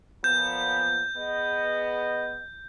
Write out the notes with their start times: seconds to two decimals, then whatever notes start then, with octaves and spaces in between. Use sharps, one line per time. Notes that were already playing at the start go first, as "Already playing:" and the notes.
0.24 A#2 F3 B3 G6
1.16 B3 G#4 D#5